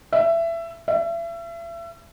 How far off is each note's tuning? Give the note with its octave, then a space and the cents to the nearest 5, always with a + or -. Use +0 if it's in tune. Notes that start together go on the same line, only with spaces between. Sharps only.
E5 +20
E5 +35